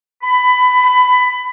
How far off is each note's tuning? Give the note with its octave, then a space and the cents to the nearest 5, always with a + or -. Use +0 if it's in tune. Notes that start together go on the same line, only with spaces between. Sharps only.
B5 +20